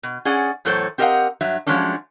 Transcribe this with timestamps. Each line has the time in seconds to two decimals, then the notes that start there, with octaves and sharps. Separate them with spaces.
0.03 B2
0.25 C#4 G#4 D5 F#5
0.65 E2 A2 F#3 A4 C5 C#5
0.98 C4 G4 A#4 D#5 F5 F#5
1.41 G2 F#3 E5
1.66 F3 F#3 G#3 A3 C#4 D4